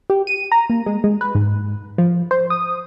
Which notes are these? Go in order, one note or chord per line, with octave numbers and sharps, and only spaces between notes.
G4
D#7
A#5
A#3
G#3
G#3
B4
G#2
F3
C5
D#6